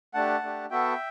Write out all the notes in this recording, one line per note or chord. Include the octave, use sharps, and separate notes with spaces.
A3 D4 G4 F#5 A5
A3 D4 G4
B3 F#4 A4 E5 G5